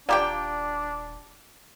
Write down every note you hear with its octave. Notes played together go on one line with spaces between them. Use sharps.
D#1 D4 F4 G4 D5 G5 A#5 D6